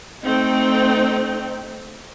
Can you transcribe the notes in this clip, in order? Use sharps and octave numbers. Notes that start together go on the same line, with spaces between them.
A3 C4 D#4 G5